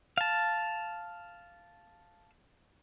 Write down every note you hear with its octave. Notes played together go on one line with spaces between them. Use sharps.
F5 A5